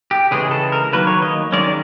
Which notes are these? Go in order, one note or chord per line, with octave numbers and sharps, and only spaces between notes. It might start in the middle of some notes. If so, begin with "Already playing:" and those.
G4
C#3 E3 G#3 G#4
A4
A#4
D#3 F#3 A#3 B4
C#5
D#5
D#3 G#3 C#4 D5